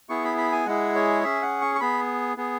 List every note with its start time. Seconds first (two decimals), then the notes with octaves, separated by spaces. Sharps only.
0.09 B3 E4 G#4 C#6
0.24 B5
0.38 B5
0.52 G#5
0.66 G#3 E4 G#4 F#5
0.95 C#5
1.23 C#4 G#4 E5
1.42 F#5
1.61 C#6
1.75 C#6
1.81 B3 G#4 B5
2.37 B3 G#4